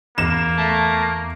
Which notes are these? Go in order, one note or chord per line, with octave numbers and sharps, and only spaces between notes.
E2 A#3 E7
A3